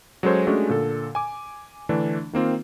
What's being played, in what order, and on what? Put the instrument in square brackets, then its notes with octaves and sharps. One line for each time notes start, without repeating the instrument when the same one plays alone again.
[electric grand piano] F#3 G#3 C#4 A4 C5 C#5
G#3 A3 C#4 D4 F#4 G4
A#2 D3 A4
G#5 D6
D3 E3 A3 D4
D#3 A#3 C4 F4